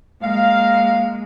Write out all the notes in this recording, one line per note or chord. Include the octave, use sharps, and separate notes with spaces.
G#3 A#3 F5